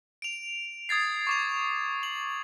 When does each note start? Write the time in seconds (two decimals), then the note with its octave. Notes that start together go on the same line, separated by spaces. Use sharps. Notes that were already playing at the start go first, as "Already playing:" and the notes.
0.22 D7 F7
0.89 D#6 G#6 A6 C7
1.27 C#6 D6 F7
2.03 F#7